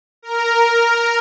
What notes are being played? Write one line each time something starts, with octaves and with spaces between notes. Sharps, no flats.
A#4
A#4